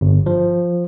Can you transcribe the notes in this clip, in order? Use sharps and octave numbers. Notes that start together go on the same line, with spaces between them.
G1
F3